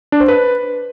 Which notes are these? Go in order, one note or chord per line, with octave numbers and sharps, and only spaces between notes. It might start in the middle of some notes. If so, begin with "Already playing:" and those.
D4
C5
B4